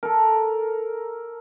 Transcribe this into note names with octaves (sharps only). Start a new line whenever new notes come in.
A4 A#4